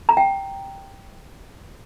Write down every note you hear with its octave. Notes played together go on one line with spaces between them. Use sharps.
A#5
G5